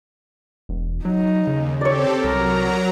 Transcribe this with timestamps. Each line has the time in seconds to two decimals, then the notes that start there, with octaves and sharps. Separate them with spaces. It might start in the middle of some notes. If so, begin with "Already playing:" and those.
0.69 E1
1.05 F#3 D#4
1.47 D#2 C#3
1.81 C4 G4 A4 C#5 D5
2.24 C2 F#3 A#4 A#5